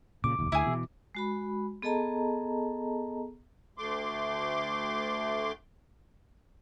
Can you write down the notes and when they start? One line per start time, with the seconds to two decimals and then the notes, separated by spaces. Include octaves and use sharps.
0.24 A#2 C#3 D6
0.39 F1 D#2
0.52 D2 E4 G#4
0.67 B2 E3
1.15 G#3 F#4 B5
1.82 B3 G#4 A4 D#5 A5 A#5
3.78 D2 A3 C6 D6